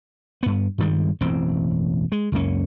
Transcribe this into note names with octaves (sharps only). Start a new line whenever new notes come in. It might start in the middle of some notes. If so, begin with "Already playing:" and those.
G2 B3
G2 D#3 G3 G#3
E1 A1 F#2 C4
G#3
C#2 F#2 A#3 C#4